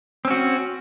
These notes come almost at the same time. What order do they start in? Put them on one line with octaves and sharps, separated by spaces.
C4 C#4 F#4